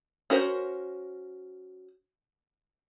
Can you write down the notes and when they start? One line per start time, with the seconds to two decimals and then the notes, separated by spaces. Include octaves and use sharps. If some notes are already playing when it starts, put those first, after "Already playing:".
0.30 C#4 F#4 A#4 C5